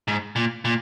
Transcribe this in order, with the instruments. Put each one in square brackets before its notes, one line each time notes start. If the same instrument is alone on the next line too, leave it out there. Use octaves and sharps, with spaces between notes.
[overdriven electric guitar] G#2
A#2
A#2